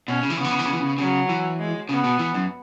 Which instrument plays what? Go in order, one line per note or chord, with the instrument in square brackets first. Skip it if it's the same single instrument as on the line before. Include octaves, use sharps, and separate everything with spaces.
[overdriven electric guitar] B2 [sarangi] C#4
[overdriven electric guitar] C#3
E3
[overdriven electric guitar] C#3 [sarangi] B3
[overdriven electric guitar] E3
C#3
E3
C#3
E3
C#3
[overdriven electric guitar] C#3 [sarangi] F#3
[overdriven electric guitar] E3
[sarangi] G#3
[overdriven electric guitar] C#3 [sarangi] B3
[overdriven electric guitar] B2
E3
F#2